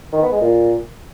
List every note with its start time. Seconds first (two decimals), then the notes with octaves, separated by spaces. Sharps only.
0.13 D#3
0.22 B3
0.32 G#3
0.41 A#2